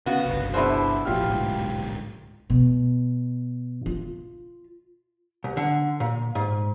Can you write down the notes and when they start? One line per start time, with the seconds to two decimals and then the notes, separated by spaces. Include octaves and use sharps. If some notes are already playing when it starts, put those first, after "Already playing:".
0.06 C#3 B3 F#4 F5
0.26 G1 C2
0.54 B2 D4 E4 G#4 C5
1.05 E1 A#1 A2 F4 G4 F6
1.25 D1 B1 G#2
2.50 B2
3.86 F4
5.44 C2
5.57 D3
6.00 A#2
6.35 G#2